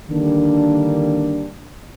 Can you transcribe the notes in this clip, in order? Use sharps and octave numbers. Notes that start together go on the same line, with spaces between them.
D3 D#3 G3 A#3 D4